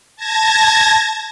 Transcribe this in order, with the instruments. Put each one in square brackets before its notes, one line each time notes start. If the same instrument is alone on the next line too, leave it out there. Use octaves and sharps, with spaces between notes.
[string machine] A5 G#6 A#6